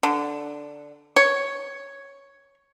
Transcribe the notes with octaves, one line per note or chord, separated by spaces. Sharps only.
D3
C#5